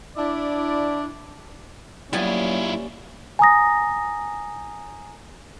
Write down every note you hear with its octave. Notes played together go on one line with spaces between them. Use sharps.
D4 E4 D5
F#3 G3 A#3 B3 C#4 E4 F4 G#5
G#5 A#5 D#6 A#6